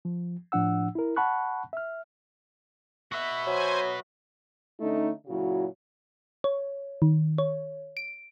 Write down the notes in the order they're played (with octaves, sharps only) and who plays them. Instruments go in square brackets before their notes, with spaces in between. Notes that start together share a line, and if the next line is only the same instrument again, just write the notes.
[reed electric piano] F3
A2 F3 D4 F#5 E6
E4 A#4
F#5 A5 B5 C#6 F#6
E5 F6
[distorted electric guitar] F#4 B4 [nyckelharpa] E5
[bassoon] F#3 [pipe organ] C5 G#5
[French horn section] D3 A3 C#4 D#4
A#2 C#3 F#3 E4 F#4
[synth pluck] C#5
D#3
C#5
D7